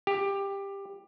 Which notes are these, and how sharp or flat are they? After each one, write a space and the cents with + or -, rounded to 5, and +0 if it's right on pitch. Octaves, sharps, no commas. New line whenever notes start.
G4 +15